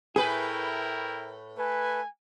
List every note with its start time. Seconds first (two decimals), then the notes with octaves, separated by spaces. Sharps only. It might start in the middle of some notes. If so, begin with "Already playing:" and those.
0.16 A2 E4 G#4 A#4 B4 G5
1.57 A3 B4 G#5